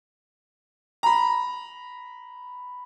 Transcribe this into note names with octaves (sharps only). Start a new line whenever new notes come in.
A#5 B5